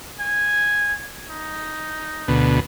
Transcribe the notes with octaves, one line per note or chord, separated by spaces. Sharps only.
G#5
D#4
D2 B2